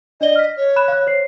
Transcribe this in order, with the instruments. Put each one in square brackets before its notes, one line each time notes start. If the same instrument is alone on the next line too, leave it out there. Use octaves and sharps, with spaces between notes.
[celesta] D4 D5 G7 [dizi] D#5
[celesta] F6 B6
[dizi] C#5
[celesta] B5 F#6 E7
F5 F#6
C5 C#5 C7